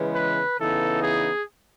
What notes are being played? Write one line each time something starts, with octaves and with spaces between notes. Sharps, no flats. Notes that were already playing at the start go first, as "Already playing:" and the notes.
Already playing: C#3 E3 G#3 B3
B4
C#3 E3 B3 D#4 A4
G#4